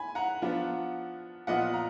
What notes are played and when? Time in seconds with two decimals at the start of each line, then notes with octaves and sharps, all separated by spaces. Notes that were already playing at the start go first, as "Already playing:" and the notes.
Already playing: G#5 B5
0.15 F#5 A#5
0.42 F3 B3 D4 F4
1.47 A#2 F3 B3 F4 D#5 F#5
1.74 A#5